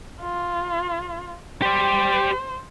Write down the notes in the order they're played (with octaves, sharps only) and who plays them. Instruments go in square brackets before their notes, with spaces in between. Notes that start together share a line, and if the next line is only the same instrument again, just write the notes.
[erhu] F4
[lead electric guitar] G4 D5 [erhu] C5